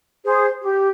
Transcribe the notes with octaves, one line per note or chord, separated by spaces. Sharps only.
G#4 C5
G4